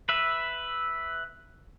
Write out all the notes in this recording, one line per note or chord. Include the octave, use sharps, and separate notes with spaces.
B4 E5